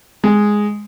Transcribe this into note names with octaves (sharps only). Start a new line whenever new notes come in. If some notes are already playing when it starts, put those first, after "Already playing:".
G#3